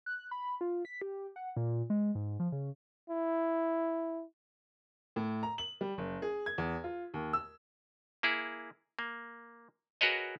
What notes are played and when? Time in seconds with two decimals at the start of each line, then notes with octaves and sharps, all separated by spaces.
0.06 F#6
0.31 B5
0.61 F4
0.85 B6
1.02 G4
1.36 F#5
1.57 A#2
1.90 G#3
2.15 G#2
2.40 F3
2.52 C#3
3.10 E4
5.16 A2
5.43 A#5
5.58 F#7
5.81 G3
5.98 F#1
6.22 G#4
6.46 G#6
6.58 E2
6.84 F4
7.14 D#2
7.33 E6
8.23 A#3 E4 G#4
8.99 A#3
10.01 F#4 G#4 A#4 B4 C#5 D#5